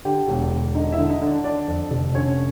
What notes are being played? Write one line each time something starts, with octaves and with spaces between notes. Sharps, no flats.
D3 G4 G5
E1
E1
D3 D#4 D#5
D#5
E4 E5
D3
D#4 D#5
D3
D4 D5
D3 D4 D5
F2
F1
D3 C#4 C#5